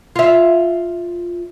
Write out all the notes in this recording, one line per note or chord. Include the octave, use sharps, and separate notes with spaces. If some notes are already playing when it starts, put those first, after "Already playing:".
F4 E5